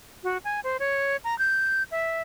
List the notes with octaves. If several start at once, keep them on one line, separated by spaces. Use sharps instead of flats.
F#4
G#5
C5
C#5
A#5
G6
E5